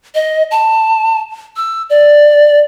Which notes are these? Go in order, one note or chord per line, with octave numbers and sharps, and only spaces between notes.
D#5
A5
E6
D5